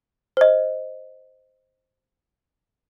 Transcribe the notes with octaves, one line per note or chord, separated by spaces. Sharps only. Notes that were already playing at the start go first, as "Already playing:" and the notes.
C5 D#5